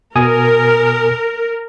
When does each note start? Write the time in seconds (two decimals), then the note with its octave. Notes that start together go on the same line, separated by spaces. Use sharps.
0.15 B2 A#4 G#5 D#6